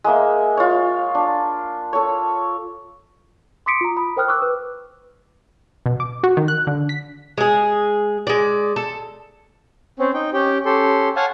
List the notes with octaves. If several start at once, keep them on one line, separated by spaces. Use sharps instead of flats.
G#3 A#3 E5
F4 C#5
D4
A4 C#5
C6 D6 D#6 B6 C#7 D7
F4 A#5
B5 D#6
A#4 C5 G5 D#6 F6 F#6
C#6 D6 E6 F#6
B4
B2
D6
F#4
D#3
F#6
D3
B6
G#3 G#4
G#3 D5
A4
C4 C#4
D#4 G5
C#4 G4 G5
C#4 G4 A4 C6
C#5 F5 F#5 G#5 A5